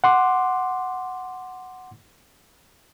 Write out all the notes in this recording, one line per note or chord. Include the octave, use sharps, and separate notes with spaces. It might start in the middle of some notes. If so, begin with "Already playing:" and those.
F#5 C6 D6